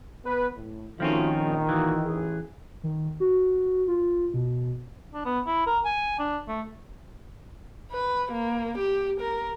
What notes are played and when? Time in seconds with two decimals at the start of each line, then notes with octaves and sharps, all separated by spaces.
0.25 B3 B4
0.55 A2
1.00 D#3 F3 A3 C4 C#4 F4 F#4
1.40 A#1
1.69 A#2 E3 A#3 F#4
2.04 A1 G#4
2.83 D#3
3.20 F#4
3.88 F4
4.34 B2
5.14 D4
5.25 B3
5.46 E4
5.66 A#4
5.85 G#5
6.19 D4
6.48 A3
7.92 B4
8.32 A#3
8.78 G4
9.21 A#4